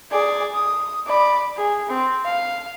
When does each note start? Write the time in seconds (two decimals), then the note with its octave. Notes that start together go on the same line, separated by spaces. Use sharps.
0.11 G#4 D5
0.54 D#6
1.07 D5 B5
1.57 G#4
1.89 C4
2.25 F5